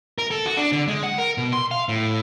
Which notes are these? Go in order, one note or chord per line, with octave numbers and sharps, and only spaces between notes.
A#4
A4
F#4
D4
D3
G#3
F#5
A#4
B2
C6
F5
A2